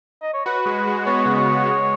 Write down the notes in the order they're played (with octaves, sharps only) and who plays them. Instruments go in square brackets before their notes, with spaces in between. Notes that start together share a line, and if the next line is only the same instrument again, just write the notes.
[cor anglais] D#5
C#5
[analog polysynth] F#4 [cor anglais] B4
[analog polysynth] G#3
G#3
[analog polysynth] B3 [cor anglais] C#5
[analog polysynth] C#3
[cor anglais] C#5
[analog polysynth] C#3
G#3